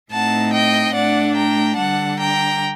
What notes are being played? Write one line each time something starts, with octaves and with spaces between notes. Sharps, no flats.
A2 A3 C4 D#4 F#5 A5
D#5 G5
A2 A3 D4 D5 F#5
G5 A#5
D3 G3 D4 F#5 A5
G5 A#5